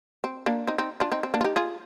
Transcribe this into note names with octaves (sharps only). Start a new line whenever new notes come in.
C4
A#3 D4
C4 D#4
C4 D#4
D4 F4
C4 D#4
C4
A#3 D4
F4
D#4 G4
F4 G#4